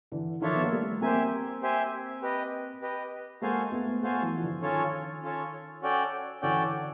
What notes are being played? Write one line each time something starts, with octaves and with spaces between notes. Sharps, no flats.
D3 E3
D#3 F3 D4 F4 A4 C#5 E5
B3
A#3
G3 A3
A#3 C4 G4 C5 E5 G#5
G4 C5 E5 G#5
G4 B4 D#5
G4 B4 D#5
G#3 A#3 F#4 A4 C5 F5 G#5
A3 B3
A3 B3 F#4 A4 C5 F5 G#5
E3 F#3
F3
D3 E3
D#3 C#4 F4 A4 C#5
C#4 F4 A4 C#5
C#4 F#4 A4 D5 G5
D3 E3 C#4 F#4 A4 D5 G5